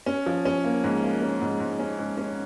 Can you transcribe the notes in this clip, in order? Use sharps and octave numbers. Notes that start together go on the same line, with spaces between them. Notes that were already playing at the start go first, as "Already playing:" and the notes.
C#4
F3
C#4
A#3
G#2
A#3
C#4
G#2
G#2
C#4
G#2
C#4